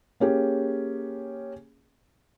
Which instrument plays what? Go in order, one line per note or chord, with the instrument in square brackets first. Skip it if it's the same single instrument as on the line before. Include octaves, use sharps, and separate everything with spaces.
[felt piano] A#3 C#4 G4 G#4